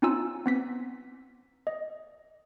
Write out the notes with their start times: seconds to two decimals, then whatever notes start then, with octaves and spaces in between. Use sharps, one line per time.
0.02 C4 C#4 D#4 F4 G#5 E6
0.46 B3 C4 B6
1.67 D#5